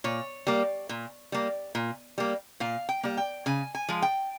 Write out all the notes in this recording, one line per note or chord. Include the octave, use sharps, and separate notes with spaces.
A#2 C#5
G3 A#3
A#2
G3 A#3
A#2
G3 A#3
A#2 F5
G5
G3 A#3
G5
C#3 G#5
G#5
F3 G#3
G5